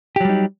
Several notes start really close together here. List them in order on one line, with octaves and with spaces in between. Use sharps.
G4 F#3 G3 D#4